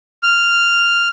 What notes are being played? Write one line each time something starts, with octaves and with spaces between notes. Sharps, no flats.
F6